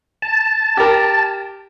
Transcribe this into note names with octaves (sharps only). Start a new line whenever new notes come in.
A5
G4 A#4